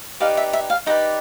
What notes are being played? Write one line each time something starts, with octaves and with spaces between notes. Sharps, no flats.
D#4 G4 B4 D5 F5
E5
E5
F5
D#4 G4 B4 D5 D#5